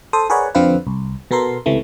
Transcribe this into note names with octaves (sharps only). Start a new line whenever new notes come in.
A4 C5 D#6
G#4 A#4 B4 C#5 D5 F#5
F2 D3 F3 C4 F4 B4
C2
B2 B3 A4 A#4 C6
C#2 C3 E3 A3